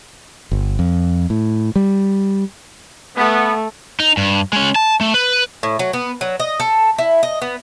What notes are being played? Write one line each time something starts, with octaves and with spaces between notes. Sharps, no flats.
G1
F2
A2
G3
A3 B3
D#4
G2
G#3 C#4
A5
A3
B4
A2
F#3
B3
F#3
D#5
A4
E4
D#5
B3